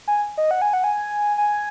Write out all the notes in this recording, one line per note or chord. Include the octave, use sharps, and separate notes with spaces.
G#5
D#5
F#5
G#5
F#5
G#5
G#5